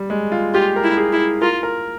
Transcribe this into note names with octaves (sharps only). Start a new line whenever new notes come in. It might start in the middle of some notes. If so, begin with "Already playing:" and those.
Already playing: G3
G#3
F4
F4 G4
A#4
E4
G#4
E4
F4 A#4
A#4